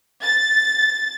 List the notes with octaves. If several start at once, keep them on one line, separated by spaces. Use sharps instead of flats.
A6